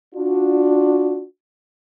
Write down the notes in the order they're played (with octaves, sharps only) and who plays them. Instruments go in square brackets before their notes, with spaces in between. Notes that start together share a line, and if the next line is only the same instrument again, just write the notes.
[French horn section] D4 F4 F#4